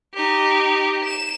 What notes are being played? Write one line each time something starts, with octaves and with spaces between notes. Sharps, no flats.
D#4 G4
E7